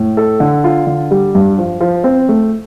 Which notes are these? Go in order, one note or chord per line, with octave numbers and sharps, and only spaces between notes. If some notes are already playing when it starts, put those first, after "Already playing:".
Already playing: A2
A4
D3
F4
D3
G3
G2
F3
F3
C4
A3